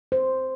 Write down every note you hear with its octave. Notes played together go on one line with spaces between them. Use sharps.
C5